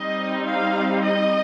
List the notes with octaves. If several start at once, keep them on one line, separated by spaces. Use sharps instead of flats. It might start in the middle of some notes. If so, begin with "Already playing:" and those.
Already playing: G3 C4 D#4 D#5
F5
D#5